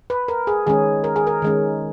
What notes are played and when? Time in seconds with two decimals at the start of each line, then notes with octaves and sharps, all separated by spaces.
0.10 B4
0.28 A#4
0.47 G#4
0.67 D#3 G#3 C#4 G#4
1.04 A#4
1.16 G#4
1.27 A#4
1.42 D#3 G#3 C#4